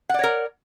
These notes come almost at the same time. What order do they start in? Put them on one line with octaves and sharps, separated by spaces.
F#5 D5 C#5 A#4